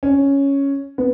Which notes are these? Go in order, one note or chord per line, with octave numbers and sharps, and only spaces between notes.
C#4
B3